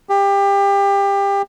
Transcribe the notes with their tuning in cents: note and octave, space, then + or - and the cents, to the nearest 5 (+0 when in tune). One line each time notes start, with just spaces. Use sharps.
G4 +25